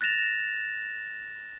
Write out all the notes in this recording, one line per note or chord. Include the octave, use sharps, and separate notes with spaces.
F#6 A6 A#6 E7 F7